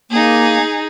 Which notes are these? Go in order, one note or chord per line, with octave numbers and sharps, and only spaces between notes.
A#3 D#4 G#4